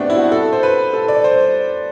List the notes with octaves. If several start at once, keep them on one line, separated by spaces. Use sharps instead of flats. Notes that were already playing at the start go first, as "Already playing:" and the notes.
Already playing: A3 B3 C4 D4 F#4 G4
E4
F#4
A4
C5
B4
A4
D5
C5